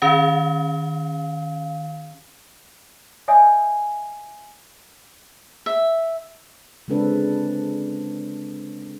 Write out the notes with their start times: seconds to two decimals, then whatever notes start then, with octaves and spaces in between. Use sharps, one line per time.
0.02 D#3 C#4 F5
3.28 C#5 D#5 E5 G#5 D#6
5.66 E5
6.88 C#3 G#3 C4 D4 A4 B4